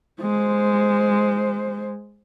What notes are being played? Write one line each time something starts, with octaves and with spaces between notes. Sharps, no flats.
G#3 C5